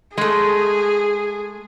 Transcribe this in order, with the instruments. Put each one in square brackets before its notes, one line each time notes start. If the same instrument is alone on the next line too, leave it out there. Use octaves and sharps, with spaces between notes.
[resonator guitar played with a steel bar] G#3 A3 [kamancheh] G#4